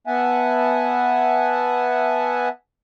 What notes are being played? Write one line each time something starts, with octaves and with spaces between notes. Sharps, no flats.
B3 E5 F#5 G#5 A5